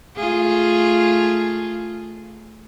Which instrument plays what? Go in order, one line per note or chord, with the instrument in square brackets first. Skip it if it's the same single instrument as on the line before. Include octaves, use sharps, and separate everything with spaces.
[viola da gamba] A3 F4 G#4